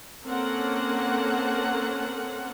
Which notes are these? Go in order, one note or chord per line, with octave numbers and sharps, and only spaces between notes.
A#3 C4 C#4 A4 A#4 F#5